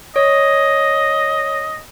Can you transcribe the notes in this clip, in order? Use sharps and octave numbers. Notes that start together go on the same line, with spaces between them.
C#5 D#5